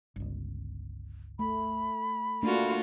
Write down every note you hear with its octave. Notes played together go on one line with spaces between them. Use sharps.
G1 C#2
A3 B5
A3 A#3 D4 F4 F#4